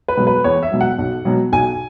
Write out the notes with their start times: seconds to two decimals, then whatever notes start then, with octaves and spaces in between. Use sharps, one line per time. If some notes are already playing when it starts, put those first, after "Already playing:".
0.08 B4
0.17 B2 F#3
0.27 B4
0.44 E2 C#5
0.63 E5
0.72 B2 F#3
0.81 F#5
0.98 B1
1.25 B2 F#3
1.52 B1 G#5